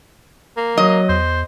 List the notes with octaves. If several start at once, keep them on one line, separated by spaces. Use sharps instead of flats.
A#3
F#3 D#5
E2 C5